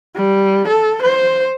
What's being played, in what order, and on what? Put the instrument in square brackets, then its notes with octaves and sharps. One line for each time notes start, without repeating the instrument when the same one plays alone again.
[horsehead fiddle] G3
A4
C5